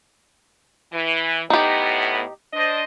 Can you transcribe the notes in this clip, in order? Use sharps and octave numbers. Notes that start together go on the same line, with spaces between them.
E3
A2 B3 D#4 G4
D4 C5 D#5